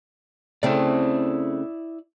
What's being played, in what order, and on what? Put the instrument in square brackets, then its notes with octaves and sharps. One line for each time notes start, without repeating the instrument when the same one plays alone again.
[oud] C#3 A3 C4 [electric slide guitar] E4 D5